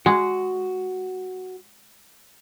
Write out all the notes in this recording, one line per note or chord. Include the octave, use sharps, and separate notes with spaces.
G#3 F#4